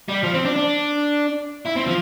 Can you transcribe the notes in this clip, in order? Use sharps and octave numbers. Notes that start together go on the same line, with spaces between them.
G3
F3
C4
D4
D4
E4
C4
F3